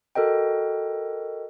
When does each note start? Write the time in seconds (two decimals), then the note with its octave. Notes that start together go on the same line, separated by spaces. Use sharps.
0.15 F#4 A4 A#4 D#5 G5